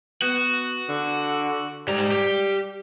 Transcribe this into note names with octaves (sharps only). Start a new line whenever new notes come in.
B3 F#4
D3
G#2 G3 A#5
G4